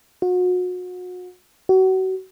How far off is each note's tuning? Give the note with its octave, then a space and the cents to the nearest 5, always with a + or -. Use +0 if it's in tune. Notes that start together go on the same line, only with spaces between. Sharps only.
F#4 -35
F#4 +30